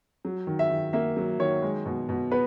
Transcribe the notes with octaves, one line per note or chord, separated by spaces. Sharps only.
F#3
D#3
E5
D#3
A#3 E5
F#3
D#3 C#5
G#3
B2
B2
B3 B4